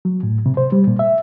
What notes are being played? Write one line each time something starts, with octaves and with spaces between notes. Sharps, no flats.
F#3
A2
C3
C5
G3
A#2
E5